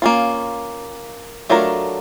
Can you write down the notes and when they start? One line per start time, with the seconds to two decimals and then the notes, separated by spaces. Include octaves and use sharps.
0.02 A#3 C#4 F4
1.49 F#3 A3 D4 F4 A#4